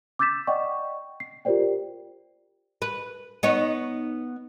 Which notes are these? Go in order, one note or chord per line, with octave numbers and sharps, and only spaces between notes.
D6 E6 G6 A6 B6 E7
D5 D#5 F#5 G5 C#6
C7
F4 G4 A#4 C5 D5 G5
B4
B3 D#4 C#5